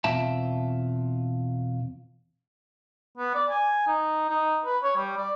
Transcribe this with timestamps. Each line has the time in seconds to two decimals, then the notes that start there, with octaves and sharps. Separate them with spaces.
0.04 E2 B2 C4 F4 E5 A5
3.18 B3
3.35 D5
3.50 G#5
3.87 D#4
4.29 D#4
4.65 B4
4.83 C#5
4.96 G3
5.17 D5